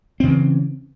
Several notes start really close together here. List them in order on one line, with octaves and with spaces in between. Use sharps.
C4 C#3 E3